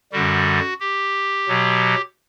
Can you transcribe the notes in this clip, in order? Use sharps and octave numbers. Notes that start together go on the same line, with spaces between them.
F#2 D3 G3 F#4
G4
B2 F#3